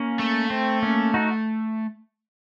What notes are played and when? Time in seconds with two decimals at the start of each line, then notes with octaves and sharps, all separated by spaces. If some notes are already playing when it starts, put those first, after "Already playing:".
Already playing: A#3 C#4
0.19 A3
0.50 C4
0.83 A#3 C#4
1.14 D#4 F#4